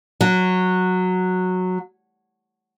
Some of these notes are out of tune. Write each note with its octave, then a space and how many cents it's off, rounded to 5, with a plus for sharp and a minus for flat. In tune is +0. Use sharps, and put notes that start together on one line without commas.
F#3 -10